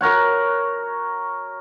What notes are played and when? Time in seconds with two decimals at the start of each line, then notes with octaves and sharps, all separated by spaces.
0.01 F#4 A#4 C#5 F#5